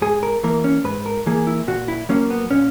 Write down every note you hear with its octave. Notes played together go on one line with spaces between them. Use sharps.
G#2 G#4
A#4
E3 A#3 A#4
C#4
G#2 B4
A#4
E3 A#3 G#4
E4
A#2 F#4
E4
F#3 A#3 C#4
B3
A#2 C#4